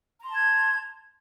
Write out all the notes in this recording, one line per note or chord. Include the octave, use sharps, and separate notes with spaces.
A5 A#5 C6 G#6